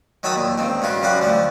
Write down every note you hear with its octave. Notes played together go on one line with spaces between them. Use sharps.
D#3 F#3 E5 A5 B5 D#6
D#2 A#2
C#2 D#3 C4
G2 C#3 F4 F#4
F#2 C#3 G3 F#4 F5 F#5
D2 F3 G3